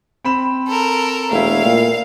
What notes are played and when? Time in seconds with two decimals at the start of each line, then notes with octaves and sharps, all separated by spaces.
0.25 C4 B5 E7
0.68 A4 A#4
1.31 E1 A3 E4 F5
1.65 A#2